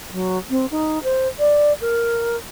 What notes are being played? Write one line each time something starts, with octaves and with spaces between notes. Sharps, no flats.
F#3
C4
D#4
C5
D5
A#4